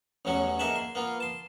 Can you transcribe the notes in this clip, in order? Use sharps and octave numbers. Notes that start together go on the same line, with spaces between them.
A1 E2 F#3 C#4 F#4
A#3 D#4 G#4 E5 F#5 A5
C6
A#3 B3 F4
A5 C6